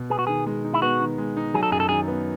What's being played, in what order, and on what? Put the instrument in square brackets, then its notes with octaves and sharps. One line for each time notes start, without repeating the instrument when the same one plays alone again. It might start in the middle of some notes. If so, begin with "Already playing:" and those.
Already playing: [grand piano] B2
[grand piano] B3 [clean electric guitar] G#4
[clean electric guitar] F#4
[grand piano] D#3 [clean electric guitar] G#4
[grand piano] G#3
D#4
[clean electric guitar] E4
[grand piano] B3 [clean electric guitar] F#4
[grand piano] D#3
G#3
D#4
[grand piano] F#3 [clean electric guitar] G#4
[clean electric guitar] A4
[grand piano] F#2 [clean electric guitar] G#4
[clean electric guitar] A4
[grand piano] D#3 [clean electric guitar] G#4
[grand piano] B3